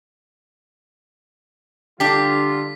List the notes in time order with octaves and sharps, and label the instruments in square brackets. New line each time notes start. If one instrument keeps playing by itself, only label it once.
[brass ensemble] D3 G3 F4 [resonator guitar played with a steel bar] D4 G4 [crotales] B6